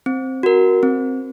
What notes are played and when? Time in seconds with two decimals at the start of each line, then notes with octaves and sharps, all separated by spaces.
0.06 C4
0.43 F#4 A#4
0.83 C4